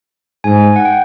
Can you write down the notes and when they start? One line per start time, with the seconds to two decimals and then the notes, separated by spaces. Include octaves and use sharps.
0.44 G#2 G#5
0.76 F#5
0.85 G5